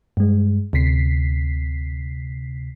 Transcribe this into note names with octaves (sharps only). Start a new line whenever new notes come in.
G2 G#3
D2 C3 B6 C7